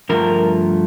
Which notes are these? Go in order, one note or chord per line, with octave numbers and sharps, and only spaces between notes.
G2 D3 F3 A3 A#4